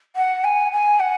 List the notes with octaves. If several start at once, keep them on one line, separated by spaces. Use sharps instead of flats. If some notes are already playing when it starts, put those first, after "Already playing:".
F#5
G#5
G#5
F#5